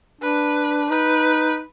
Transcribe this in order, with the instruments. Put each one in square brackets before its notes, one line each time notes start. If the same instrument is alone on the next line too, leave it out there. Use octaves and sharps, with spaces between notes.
[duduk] D4 [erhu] B4
[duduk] D#4 [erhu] B4